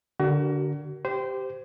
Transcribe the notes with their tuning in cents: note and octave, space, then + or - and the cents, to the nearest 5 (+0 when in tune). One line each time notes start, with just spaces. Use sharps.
D3 -10 F#4 +35 A#4 +0
G4 -5 C5 -20